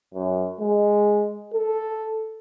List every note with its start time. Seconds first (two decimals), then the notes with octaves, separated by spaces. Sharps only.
0.14 F#2
0.60 G#3
1.54 A4